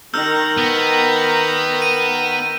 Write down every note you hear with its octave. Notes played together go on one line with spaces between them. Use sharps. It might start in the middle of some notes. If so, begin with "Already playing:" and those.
D#3 A#5 E6 F6 G6
B3
D#7